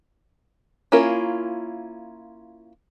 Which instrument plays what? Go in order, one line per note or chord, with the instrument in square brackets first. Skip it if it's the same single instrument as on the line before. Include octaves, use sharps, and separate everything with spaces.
[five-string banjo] A#3 C#4 E4 F4 A#4